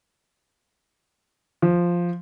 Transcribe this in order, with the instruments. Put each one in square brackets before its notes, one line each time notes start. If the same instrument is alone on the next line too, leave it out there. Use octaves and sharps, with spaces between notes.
[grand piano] F3